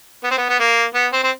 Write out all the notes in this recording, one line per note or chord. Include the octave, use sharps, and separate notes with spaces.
B3
C4
B3
B3
A#3
B3
C4
C4